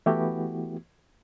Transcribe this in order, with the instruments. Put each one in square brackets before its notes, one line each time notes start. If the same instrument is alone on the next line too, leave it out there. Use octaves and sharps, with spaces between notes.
[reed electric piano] E3 A3 B3 E4 F#4 G4